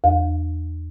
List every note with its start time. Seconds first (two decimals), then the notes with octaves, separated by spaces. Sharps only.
0.04 E2